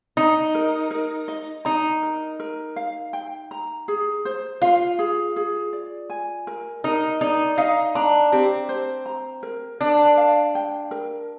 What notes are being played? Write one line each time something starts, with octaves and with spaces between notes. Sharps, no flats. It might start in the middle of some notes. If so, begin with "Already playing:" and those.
D#4 A#5
A#4
A#4
D#5
D#4 A#5
A#4
A#4
F5
G5
A#5
G#4
C5
F4 F5
G#4
G#4
D5
G#5
A#4
D#4 A#4
D#4 D5
D#4 F5
D4 A#5
C4 G4
C5
A#5
A#4
D4 A#4
F5
G5
A#4